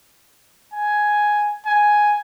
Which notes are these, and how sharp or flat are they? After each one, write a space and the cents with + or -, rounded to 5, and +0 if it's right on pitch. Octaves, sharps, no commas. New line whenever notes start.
G#5 +5
G#5 +5